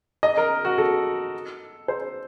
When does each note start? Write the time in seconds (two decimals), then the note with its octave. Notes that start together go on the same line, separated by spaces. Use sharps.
0.23 D#5
0.37 A#4
0.65 F#4
0.78 A4
1.88 C5